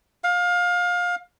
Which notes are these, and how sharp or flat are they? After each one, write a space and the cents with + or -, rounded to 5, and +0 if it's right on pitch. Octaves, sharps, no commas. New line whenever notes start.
F5 +25